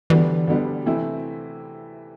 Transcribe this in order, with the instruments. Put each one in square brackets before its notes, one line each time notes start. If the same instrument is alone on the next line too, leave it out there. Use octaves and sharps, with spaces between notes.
[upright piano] D2 D3 G3 B3 D4 [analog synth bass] E3
[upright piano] D2 D3 G3 B3 D4
C3 E3 A3 C4 E4